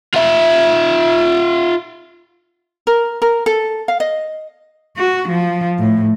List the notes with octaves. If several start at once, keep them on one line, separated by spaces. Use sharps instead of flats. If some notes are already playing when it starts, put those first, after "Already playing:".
F4 E5
A#4
A#4
A4
F5
D#5
F#4
F3
A2